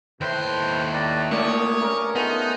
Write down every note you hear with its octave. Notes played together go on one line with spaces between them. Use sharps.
D#2 A2 B4 C5 G5 C6
B4 D5 A#5
A3 A#3 C#5 D5 D6 D#6
G2 C#4 A#4
A3 B3 D#4 F4 G#4